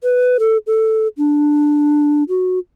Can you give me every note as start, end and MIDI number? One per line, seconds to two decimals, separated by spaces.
0.03 0.37 71
0.39 0.57 69
0.67 1.07 69
1.17 2.23 62
2.29 2.59 66